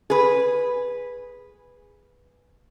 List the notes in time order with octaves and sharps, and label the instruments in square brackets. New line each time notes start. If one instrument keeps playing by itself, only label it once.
[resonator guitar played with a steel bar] G#4 B4